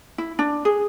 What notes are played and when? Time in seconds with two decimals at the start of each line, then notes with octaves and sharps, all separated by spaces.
0.18 E4
0.39 D4
0.65 G#4